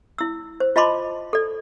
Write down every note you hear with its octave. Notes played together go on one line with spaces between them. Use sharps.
E4 E6
C5
F4 D#5 A5 B5 C6 D6
A4 D5